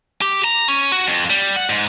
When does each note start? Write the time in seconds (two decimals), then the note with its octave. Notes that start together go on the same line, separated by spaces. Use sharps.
0.21 G4
0.44 A#5
0.68 C#4
0.92 F#4
1.07 F2
1.30 G3
1.56 F#5
1.70 G#2